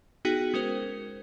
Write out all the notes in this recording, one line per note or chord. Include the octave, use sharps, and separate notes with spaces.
B3 D#4 F#4 G#4 G5
G#3 C#4 A#4 C5